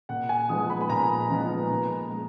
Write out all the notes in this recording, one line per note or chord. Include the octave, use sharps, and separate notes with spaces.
A#2 F#5
G#5
F3 G#3 B3 D#4 D#6
B5
B5
A#2 A#5
F3 G#3 B3 D#4
A#2
G#3